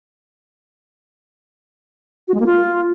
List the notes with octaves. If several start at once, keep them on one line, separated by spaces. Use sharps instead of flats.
F#4
G#3
A#3
F4